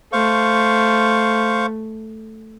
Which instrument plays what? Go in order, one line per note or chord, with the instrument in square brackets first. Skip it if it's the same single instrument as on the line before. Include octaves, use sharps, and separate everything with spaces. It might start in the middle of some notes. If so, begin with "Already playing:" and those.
[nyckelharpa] A3 [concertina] C5 F5 C#6